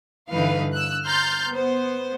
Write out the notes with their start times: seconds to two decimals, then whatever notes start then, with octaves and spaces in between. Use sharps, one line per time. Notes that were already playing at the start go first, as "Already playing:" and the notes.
0.31 G2 D3 E3 D#4 B4 F5
0.74 E6 F#6
1.06 A#5 C6 F6 G6 A6
1.49 B3 C5